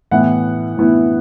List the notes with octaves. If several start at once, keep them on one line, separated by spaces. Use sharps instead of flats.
A2 E3 B3 E4 F#5
A2 E3 B3 E4